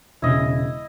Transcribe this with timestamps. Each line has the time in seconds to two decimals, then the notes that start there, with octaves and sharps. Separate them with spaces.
0.22 E1 C#3 E4 D#5